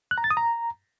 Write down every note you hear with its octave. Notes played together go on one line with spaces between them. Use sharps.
F#6
A#5
A6
D#6
A#5